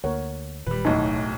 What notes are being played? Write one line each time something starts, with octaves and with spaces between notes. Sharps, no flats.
D2 A#3 A#4 C#5 F#5
E1 A#2 D#3 G3 B4
D1 B1 A2 D#4 A5